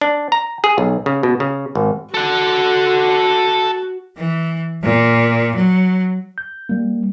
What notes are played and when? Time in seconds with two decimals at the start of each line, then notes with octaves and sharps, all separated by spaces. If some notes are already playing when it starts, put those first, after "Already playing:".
0.01 D4
0.32 A#5
0.64 G#4
0.78 B1
1.06 C#3
1.23 B2
1.40 C#3
1.75 G#1
2.14 F#4 A4 F#5
4.17 E3
4.83 A#2
5.57 F#3
6.38 G6
6.69 G3 A#3